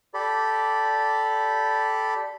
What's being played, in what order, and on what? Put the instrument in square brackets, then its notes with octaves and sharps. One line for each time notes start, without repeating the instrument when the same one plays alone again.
[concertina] G4 A4 D5 B5